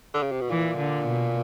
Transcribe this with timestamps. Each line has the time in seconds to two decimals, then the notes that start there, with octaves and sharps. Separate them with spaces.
0.14 D3
0.23 C#3
0.31 C3
0.41 B2
0.49 A#2 E3
0.77 D3
1.06 B2